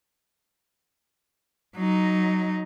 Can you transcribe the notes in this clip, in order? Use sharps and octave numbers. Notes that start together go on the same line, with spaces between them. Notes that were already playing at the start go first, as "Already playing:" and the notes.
F#3 D#4